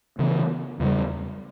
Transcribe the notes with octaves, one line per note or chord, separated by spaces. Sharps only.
C#3 E3 B3
E2 C#3 G3